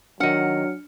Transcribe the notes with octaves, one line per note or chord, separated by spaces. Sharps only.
D#3 F#3 D4 F#5 F6 C#7